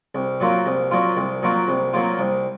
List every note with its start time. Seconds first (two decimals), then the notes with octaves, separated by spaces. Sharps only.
0.15 C2
0.40 A#2 F#3 A#3 F4
0.66 C2
0.91 A#2 F#3 A#3 F4
1.17 C2
1.42 A#2 F#3 A#3 F4
1.68 C2
1.93 A#2 F#3 A#3 F4
2.19 C2